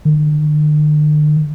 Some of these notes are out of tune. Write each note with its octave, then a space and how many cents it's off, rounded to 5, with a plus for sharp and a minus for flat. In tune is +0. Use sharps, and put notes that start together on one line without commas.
D3 +45